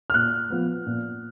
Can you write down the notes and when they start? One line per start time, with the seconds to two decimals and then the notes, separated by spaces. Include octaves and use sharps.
0.10 F6
0.14 A#2 F#6
0.50 F3 B3
0.86 A#2